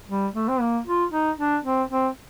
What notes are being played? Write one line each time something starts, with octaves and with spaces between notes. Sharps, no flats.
G3
A3
C4
A#3
F4
D#4
D4
C4
C4